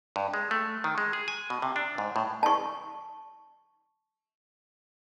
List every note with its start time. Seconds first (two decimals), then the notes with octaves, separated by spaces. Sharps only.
0.16 G2
0.34 G#3
0.51 A3
0.84 D#3
0.98 G#3
1.13 G#4
1.28 G#5
1.50 B2
1.62 C3
1.76 D4
1.98 G#2
2.16 A2
2.43 A5 C#6